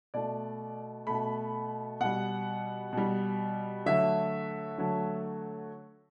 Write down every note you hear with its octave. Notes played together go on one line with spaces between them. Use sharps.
B2 A3 D5
B2 A3 B5
B2 G3 F#5
B2 G3
D3 F#3 A3 E5
D3 F#3 A3